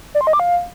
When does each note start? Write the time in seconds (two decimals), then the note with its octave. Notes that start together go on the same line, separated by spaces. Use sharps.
0.15 D5
0.21 C6
0.27 D#5
0.33 D6
0.40 F5